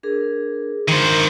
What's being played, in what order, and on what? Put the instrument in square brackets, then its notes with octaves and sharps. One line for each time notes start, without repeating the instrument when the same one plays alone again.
[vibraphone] D4 G#4 A#4
[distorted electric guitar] D#3 C5 [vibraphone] D4 A#4